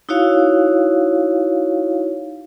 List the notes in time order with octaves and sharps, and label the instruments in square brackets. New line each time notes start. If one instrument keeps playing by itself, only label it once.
[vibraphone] D#4 E4 F#4 C#5 F5